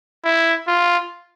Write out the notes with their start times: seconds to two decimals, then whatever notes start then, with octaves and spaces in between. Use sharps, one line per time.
0.24 E4
0.67 F4